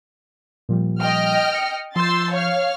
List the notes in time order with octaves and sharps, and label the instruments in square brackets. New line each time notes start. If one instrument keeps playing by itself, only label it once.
[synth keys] A#2 F3 G3
[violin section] D#5 G5 F6
[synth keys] C#7
[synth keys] F3 G6 [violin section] C6 E6 A6
[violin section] C#5 F5 F6